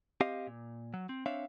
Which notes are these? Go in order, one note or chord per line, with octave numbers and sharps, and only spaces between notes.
C4 G4 D#5 F5
A#2
F#3
C4
C4 D4 C#5 E5 F5